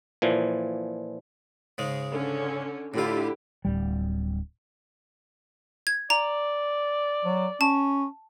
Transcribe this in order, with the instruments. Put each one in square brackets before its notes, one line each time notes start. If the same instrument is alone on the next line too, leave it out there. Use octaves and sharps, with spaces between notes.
[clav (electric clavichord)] A#2 E3 F3
[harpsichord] G#2 C#3 G#3
[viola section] D3 C#4
[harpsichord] A2 F4 [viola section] D3 E4 G4
[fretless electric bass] D1 G3
[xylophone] G#6
[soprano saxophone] D5 [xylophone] A#5
[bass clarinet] F#3
[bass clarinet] C#4 [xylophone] A5